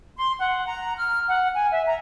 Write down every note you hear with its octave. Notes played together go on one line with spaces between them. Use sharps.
C6
F#5
A#5
F6
F#5
G#5
E5
A#5